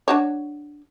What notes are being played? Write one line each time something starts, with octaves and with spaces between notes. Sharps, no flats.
D4 F#4 C#5